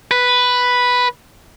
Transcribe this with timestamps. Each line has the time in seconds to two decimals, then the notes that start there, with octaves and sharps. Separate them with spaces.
0.11 B4